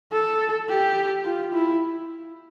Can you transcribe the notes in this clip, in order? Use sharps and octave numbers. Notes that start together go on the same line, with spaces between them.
A4
G4
F4
E4